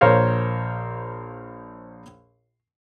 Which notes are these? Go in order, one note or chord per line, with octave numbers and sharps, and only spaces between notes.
A#1 A#4 C5 C#5 F5